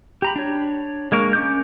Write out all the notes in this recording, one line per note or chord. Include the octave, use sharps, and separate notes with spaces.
G4 A#5 B5
D4 C#5
G#3 A#3 A#4 C#6
C#4 D6 G6